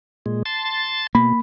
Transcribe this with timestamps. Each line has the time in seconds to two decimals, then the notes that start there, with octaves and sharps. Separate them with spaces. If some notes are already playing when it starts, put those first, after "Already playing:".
0.26 A#2 G#3
0.46 A5 C6 A6
1.15 B2 A#3 B5